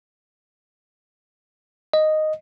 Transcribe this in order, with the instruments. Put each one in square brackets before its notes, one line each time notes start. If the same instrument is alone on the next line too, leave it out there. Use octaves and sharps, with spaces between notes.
[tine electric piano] D#5